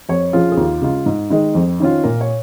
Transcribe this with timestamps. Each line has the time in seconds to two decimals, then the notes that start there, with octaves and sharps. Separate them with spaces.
0.09 F2 C#5
0.33 F3 C#4 F4 G#4
0.52 G#4
0.57 D#2 F4
0.81 C#3 G#3 F4
1.06 G#2
1.30 D#3 G#3 D#4
1.55 F2
1.80 D#3 C#4 F4
2.04 A#2 A#4
2.21 C#5